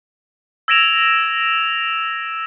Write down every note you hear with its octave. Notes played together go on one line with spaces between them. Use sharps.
E6 G#6 A#6 D7 E7 F7